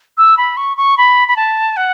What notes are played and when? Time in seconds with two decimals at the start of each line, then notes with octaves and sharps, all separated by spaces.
0.18 E6
0.37 B5
0.57 C#6
0.77 C#6
0.98 B5
1.28 B5
1.36 A5
1.77 F#5